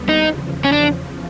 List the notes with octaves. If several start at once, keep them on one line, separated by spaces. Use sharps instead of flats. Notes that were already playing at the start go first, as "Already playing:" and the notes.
Already playing: D#2 D3 G3 B3
D#4
E2 C#3 F3
C#4
D4